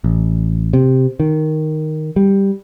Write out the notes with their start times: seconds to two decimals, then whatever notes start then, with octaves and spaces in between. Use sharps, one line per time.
0.04 A1
0.73 C3
1.20 D#3
2.16 G3